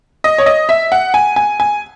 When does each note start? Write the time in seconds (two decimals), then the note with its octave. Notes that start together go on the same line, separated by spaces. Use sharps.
0.24 D#5
0.38 C#5
0.46 D#5
0.69 E5
0.92 F#5
1.14 G#5
1.36 G#5
1.60 G#5